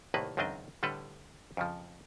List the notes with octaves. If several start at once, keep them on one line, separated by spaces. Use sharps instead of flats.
C2 A2 D#3 A#3 B4
C#2 F#2 D#3 C4 D4 D#5
A2 D3 G3 A4 B4
F2 C#3 F3